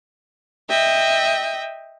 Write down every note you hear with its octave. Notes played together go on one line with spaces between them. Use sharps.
D#5 E5 G5